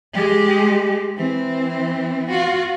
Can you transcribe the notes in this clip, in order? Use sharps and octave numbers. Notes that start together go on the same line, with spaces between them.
G#3 G4
E3 C4
F4 F#4